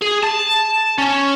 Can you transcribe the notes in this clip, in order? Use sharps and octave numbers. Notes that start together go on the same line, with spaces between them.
G#4
A5
C#4